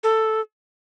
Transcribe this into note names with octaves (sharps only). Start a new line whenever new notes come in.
A4